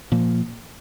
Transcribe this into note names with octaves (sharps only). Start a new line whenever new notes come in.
A#2 F3 A#3